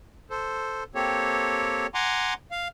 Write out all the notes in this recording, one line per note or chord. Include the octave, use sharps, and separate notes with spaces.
A4 C5
A#3 C4 G4 A4 C#5
F#5 G#5 A#5 C6 D6
F5